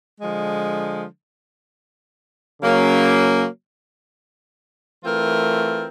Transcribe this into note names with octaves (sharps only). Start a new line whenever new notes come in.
D3 F3 G#3
C#3 F#3 A#3 C#4
E3 A3 C4 F4 A#4